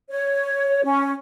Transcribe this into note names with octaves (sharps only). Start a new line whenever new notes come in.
C#5
C#4